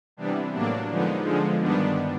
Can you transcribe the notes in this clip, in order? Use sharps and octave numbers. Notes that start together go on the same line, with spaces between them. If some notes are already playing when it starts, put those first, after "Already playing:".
C3 E3 G3 B3 D4
A2 F#3 A#3 D4
D3 F3 G#3 B3 D#4
D3 F3 G#3
G2 D#3 G3 B3 D4